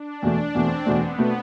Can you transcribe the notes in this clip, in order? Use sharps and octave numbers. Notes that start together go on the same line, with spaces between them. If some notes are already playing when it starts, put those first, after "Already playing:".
Already playing: D4
E2 B2 A3
E2 B2 A3 C4
E2 B2 A3 B3
B2 A3